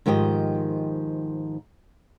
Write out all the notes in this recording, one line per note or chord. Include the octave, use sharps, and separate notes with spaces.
G#2 D#3 F3 G4 D#5